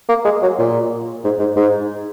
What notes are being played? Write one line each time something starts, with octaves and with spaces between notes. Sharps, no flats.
A#3
G#3
F#3
A#2
G#2
G#2
G#2